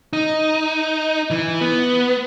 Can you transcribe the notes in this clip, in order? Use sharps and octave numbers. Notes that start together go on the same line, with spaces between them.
D#4
E3
B3